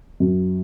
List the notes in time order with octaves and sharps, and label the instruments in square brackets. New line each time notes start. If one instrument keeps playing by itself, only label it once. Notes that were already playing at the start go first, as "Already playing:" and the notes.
[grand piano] F#2